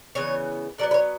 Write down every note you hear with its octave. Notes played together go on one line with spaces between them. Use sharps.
C#3 E3 B3 C#5
D3 F#3 B3 D5
B4
C#5